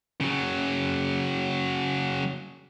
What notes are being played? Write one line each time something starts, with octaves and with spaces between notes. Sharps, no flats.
C#3 F#3